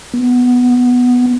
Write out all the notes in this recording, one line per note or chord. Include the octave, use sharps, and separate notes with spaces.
B3